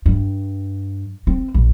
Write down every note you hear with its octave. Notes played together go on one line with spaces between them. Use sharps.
G2
C4
A#1